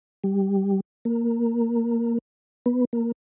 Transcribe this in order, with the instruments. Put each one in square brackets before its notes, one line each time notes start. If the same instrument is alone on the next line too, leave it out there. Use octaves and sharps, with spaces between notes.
[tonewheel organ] G3
A#3
B3
A#3